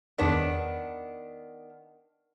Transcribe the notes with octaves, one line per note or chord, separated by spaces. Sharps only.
E2 D#3 B3 D4 C#5